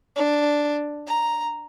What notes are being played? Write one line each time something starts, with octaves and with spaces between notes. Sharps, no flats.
D4
A#5